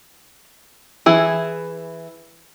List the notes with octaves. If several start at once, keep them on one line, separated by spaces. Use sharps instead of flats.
E3 E4 G#4